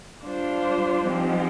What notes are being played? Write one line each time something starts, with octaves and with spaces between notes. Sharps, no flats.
G3 D4 F4 C5
G#2 F3 C4 G4